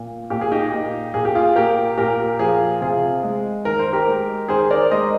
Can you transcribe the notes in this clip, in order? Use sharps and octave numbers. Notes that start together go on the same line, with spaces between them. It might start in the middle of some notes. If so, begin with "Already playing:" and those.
Already playing: A#2
A#2 G4
G#4
D#4 G4
A#2
A#2 G#4
G4
F4 G#4
A#2 G4 A#4
A#2 G4 A#4
F3 F4 G#4
C3 F4 G#4
G#3
D#3 A#4
C5
G4 A#4
G#3
D#3 G#4 C5
A#4 D5
G#3 C5 D#5